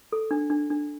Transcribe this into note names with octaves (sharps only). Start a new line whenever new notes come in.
A4
D4
D4
D4